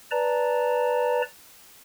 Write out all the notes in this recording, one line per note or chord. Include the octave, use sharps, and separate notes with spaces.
B4 D5 A5 A#5